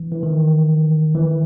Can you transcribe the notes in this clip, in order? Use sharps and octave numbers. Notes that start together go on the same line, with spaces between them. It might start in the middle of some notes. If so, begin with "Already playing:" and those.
Already playing: E3
E3
D#3
E3